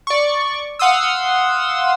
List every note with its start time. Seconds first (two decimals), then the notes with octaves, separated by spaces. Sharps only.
0.07 D5 C#6
0.79 F5 F#5 C6 D#6 E6